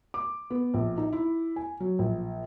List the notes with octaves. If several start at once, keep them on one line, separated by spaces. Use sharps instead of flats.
D6
B3
A#1
D#4
E4
G#5
F#3
A#1